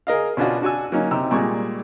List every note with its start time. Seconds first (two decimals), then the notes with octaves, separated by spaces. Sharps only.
0.07 G#4 A#4 D#5 F5
0.37 B2 C#4 D4 F4 F#4
0.62 D4 F#4 G#5 E6
0.92 F#3 A#3 C#4 D#4
1.11 C3 D#4 G5 A#5 E6
1.31 A#2 G3 G#3 C#6